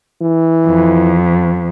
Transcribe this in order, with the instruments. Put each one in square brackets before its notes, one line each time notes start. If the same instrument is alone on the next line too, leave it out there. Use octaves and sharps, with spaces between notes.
[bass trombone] E3
[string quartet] F2